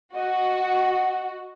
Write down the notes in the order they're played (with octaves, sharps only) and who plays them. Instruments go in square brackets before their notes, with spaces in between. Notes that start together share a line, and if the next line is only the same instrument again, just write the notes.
[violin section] F#4 [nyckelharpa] D#5 [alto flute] F#5